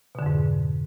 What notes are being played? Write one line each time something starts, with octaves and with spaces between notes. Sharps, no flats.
F2 G#2 B2 D3